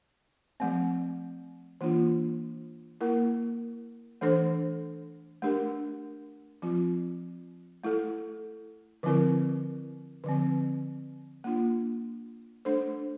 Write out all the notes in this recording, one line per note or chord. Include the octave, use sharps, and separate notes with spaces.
F3 A3 C4
E3 A#3 D4 F4
A#3 E4 A#4
E3 A3 D4 A4 C5
A3 D4 G4 A#4
F3 C4 F4
A3 E4 A4
D3 F3 C4 E4 A#4
D3 F3 C4
A#3 D4 F4
A3 D4 A4 C5